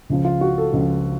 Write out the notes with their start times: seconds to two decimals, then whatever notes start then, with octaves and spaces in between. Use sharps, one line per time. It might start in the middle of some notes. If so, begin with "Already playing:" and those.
0.10 C#2 C#3 F3
0.25 F4
0.41 F#4
0.58 A4
0.73 C#2 C#3 F3